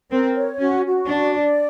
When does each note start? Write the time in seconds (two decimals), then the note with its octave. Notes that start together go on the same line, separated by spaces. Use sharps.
0.10 C4 A#4
0.35 C#5
0.59 C#4 F#4
0.85 F#4
1.10 D4 D5
1.35 D5